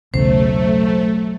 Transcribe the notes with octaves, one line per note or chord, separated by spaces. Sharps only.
B1 E2 C#3 F#3 A3 C5